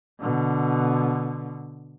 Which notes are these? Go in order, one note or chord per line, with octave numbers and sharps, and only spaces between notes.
B2 D3